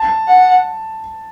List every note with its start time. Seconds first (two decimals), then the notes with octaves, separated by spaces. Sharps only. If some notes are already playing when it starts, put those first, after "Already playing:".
Already playing: A5
0.28 F#5